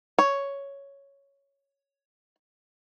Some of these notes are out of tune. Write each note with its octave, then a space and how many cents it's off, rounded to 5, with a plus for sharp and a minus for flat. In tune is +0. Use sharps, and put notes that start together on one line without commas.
C#5 +5